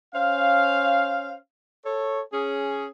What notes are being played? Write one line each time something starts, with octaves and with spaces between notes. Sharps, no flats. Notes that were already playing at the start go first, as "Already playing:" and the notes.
C#4 C5 F5
A4 C#5
C#4 G#4